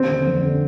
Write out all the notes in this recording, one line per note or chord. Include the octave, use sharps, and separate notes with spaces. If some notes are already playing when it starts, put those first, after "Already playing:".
Already playing: D#2 C4
D3
F1
D3